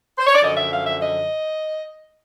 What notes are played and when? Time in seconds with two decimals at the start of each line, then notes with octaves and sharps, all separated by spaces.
0.18 C5
0.27 C#5
0.35 D5
0.42 F#2 D3 F3 D#5
0.57 E5
0.71 F5
0.86 E5
1.01 D#5